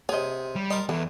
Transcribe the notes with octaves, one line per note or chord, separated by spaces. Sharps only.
C3 G#4 C#5 D#5
G3
A#4 D#5 A5 C6
E2 E3 A4